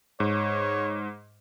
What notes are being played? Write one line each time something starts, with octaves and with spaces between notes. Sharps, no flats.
G#2 C#5